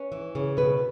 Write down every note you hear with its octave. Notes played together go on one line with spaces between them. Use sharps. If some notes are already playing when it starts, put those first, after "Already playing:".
Already playing: C#4 B4
E3
C#3
B2 B4